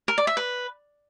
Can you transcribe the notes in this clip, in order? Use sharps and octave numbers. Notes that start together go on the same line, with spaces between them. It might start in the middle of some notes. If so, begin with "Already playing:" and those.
A#4
D5
E5
B4